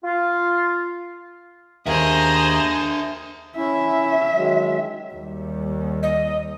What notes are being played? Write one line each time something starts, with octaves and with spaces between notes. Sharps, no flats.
F4
D#2 D4 G#4 C5 D#5 E5 A#5
C#4 E4 E5
D#3 F#3 G#3
D#2 G3
D#5